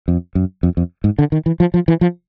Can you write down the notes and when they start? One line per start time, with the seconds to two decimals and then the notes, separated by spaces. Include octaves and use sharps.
0.08 F2
0.35 F#2
0.63 F2
0.77 F2
1.04 G#2
1.19 D3
1.32 D#3
1.46 E3
1.60 F3
1.74 F3
1.88 E3
2.01 F3